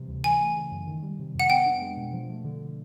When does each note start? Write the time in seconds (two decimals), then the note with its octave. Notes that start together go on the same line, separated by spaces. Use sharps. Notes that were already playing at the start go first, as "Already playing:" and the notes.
Already playing: C3 E3 G3
0.08 D2
0.24 E3 G#5
0.40 A3
0.56 C#3
0.71 F#2
0.87 D#3
1.03 G3
1.19 C3
1.35 F2 F#5
1.50 B3 G5
1.66 D4
1.82 G#3
1.97 B2
2.13 F3
2.29 A3
2.44 D3